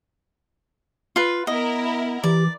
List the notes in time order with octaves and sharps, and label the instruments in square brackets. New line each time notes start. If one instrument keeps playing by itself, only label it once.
[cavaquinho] F4 B4
[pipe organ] B3 [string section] E4 A#4 [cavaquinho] D#5
[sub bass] E3 [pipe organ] G4 [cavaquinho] D5